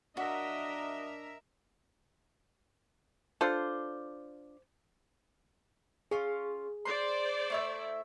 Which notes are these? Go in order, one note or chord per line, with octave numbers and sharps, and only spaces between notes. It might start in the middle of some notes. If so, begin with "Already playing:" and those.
D4 F#4 A#4 D#5 E5
D4 F4 A4 C5
C#4 F4 G#4
C5 D5 C6
A3 E4 E5